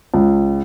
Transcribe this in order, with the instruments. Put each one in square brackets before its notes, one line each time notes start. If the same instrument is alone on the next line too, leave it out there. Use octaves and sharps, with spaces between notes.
[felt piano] C#2